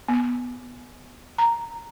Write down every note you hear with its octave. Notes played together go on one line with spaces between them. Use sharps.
B3
A#5